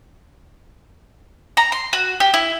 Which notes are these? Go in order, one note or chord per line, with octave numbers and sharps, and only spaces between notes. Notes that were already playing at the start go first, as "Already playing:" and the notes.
A#5
C6
F#4
G4
E4